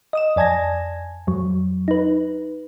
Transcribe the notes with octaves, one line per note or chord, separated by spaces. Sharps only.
D#5 D#6 E7
F2 D5 G#5 A5 G#6 A#6
F2 F#3
D#4 B4